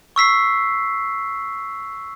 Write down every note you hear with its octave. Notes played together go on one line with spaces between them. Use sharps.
C#6 E6 B6 C7